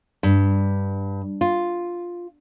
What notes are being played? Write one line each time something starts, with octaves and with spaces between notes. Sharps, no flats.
G2
F4